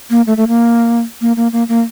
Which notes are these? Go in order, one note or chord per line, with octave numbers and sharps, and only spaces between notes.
A#3
A3
A3
A#3
A#3
A#3
A#3
A#3